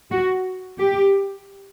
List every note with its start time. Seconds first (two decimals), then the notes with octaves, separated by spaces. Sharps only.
0.10 F#4
0.79 G4